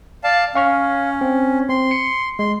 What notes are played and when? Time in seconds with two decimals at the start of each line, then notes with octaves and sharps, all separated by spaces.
0.24 D5 F5 A5
0.55 C#4 F5 C#6 F6
1.21 C4
1.69 C4 C6
1.91 C#7
2.39 G#3 C6